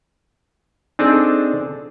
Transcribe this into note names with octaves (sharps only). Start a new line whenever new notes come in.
C4 D4 D#4 G#4 A4